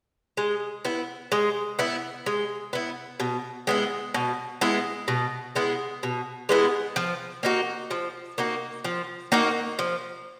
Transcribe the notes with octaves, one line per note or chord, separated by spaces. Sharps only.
G#3
B3 E4
G#3
B3 E4
G#3
B3 E4
B2
G#3 B3 E4
B2
G#3 B3 E4
B2
G#3 B3 E4
B2
G#3 B3 E4
F3
A#3 D#4 F#4
F3
A#3 D#4 F#4
F3
A#3 D#4 F#4
F3